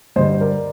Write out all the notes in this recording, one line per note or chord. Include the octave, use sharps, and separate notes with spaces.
G2 D3 G3 C5 D#5
A#4 D5